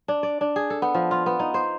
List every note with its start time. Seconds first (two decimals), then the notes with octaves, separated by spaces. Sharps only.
0.08 D4
0.23 D5
0.41 D4
0.56 G#4
0.70 A4
0.82 B3
0.94 F3
1.11 F4
1.26 B3
1.39 D#4
1.54 C5